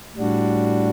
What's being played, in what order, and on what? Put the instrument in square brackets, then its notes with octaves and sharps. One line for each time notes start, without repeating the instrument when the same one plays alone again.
[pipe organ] A2 G3 D4 F#4